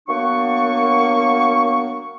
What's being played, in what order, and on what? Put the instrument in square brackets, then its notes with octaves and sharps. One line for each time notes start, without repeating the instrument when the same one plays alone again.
[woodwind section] F#3 A#3 B3 D4 C#6